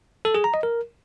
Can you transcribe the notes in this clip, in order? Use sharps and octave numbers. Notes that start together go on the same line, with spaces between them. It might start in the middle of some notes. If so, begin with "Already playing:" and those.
A4
G#4
A#5
D#5
A#4